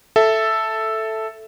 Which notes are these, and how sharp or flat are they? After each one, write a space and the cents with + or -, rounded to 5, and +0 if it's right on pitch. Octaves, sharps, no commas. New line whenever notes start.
A4 +0 E5 +0